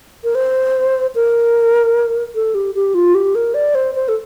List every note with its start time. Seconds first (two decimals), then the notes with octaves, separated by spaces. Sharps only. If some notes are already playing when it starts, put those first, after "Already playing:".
0.24 A#4
0.35 C5
1.15 A#4
2.35 A4
2.55 G4
2.75 G4
2.94 F4
3.15 G4
3.35 A#4
3.54 D5
3.75 C5
3.95 C5
4.08 A4